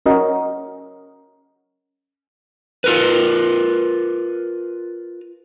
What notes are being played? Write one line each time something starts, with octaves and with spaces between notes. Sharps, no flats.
C#4 F#4 A#4 D#5
F4 A#4 B4